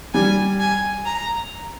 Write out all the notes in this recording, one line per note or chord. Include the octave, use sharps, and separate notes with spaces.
G3 G#5
G#5
A#5